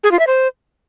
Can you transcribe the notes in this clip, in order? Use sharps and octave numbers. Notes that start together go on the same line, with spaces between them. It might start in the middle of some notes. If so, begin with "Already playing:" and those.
G#4
F4
E5
C5